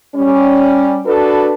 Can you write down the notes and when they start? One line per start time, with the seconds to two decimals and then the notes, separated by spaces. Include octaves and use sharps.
0.15 G3 C#4
1.06 D4 F#4 A4 B4